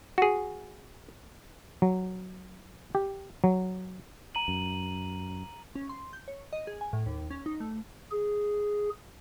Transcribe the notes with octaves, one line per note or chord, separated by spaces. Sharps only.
F#4 G#4
F#3
G4
F#3
A#5 D#7 F#7
F#2
C#4
C6
G6
C#5
D#5
G#4
G#5
A2
D#2
C#4
D#4
A3
G#4